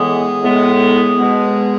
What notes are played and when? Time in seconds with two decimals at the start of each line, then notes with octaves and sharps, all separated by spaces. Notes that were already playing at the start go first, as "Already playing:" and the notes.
Already playing: A2 E3 G#3 B3 G#4
0.42 A2 G#3 B3
1.17 B2 G#3 B3